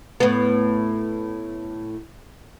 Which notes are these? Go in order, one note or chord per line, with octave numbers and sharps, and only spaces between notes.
A2 B3